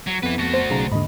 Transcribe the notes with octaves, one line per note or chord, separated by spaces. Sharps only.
F#3
F2 B3 E4 B4
A3 F#4
C5
B1 C#3 A#5
D#2 G#2 D3 D#5 B5